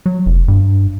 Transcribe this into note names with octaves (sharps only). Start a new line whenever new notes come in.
F#3
F1
G2